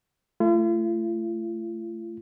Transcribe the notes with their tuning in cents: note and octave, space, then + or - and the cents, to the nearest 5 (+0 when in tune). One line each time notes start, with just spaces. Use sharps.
A3 +0 F4 -45